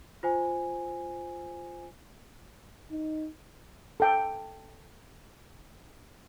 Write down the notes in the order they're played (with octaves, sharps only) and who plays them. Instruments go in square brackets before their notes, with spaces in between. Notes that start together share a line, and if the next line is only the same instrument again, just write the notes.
[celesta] F4 C5 G#5
[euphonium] D#4
[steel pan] A4 G5